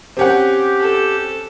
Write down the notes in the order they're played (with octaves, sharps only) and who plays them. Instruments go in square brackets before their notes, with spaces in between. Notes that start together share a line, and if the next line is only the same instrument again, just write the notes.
[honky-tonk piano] C4 C#4 F#5 [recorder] G4
[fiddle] A4